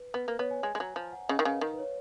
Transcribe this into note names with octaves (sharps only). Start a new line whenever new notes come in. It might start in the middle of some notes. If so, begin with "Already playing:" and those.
Already playing: B4
B3 B4
A#3
B3 C#5
G#5
G#3 G#5
G#3
F#3 A#5
F3 G#5
F#5
C#3 D#5
D#3 A#4
C#3 B4
D#3 F5
B4
C#5